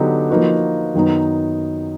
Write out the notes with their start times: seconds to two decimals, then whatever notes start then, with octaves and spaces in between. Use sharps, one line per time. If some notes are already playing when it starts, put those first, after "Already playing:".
Already playing: D3 F#3 B3 D#4 G4
0.30 F3 A#3 D#4 F#4 B4
0.95 F#2 D#3 F#3 B3 D#4